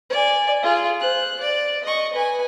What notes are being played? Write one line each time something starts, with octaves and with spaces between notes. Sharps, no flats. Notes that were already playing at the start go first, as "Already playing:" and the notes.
D5 G#5
F4 G#4
C5 F#6
D5
D#5 C#6
B4 G#5